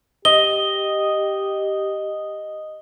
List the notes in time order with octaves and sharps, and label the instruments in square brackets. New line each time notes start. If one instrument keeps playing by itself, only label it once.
[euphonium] G4 [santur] D#5 [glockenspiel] G7